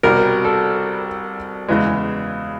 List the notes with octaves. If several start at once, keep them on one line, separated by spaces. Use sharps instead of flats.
C2 B2 G3 A#4
A4
E2 C#3 E3 G#3